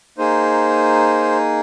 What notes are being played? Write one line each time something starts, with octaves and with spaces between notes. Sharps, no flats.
A#3 D#4 G#4 C5